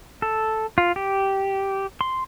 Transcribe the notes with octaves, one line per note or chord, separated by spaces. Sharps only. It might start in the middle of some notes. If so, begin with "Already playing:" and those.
A4
F4
G4
C6